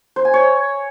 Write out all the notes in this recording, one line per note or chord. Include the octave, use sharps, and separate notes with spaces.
C5
G#5
C#5